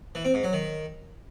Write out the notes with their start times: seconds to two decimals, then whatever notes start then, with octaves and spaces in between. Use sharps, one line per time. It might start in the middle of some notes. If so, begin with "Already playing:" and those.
0.15 E3
0.25 C4
0.34 G#2
0.43 F#3
0.53 D#3